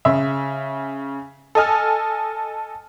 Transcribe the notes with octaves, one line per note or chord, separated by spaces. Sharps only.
C#3 E5
A4 D#5 G#5 F6